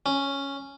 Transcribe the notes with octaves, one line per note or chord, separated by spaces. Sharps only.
C#4